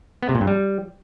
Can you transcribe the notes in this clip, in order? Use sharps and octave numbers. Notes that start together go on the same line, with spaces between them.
B3
C3
A#2
G2
G3